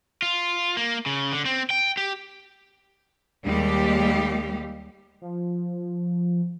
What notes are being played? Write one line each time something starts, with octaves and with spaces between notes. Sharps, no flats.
F4
A#3
C#3
D3
C4
G5
G4
D#2 G3 G#3 G4
F3